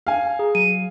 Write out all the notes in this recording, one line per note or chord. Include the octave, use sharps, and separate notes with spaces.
F5 G#5
G#4 A#5
F#3 D#7